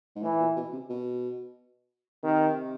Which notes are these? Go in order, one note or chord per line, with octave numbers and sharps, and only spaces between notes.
G#2
A2 E3
A#2
B2
C3
B2
C3 D#3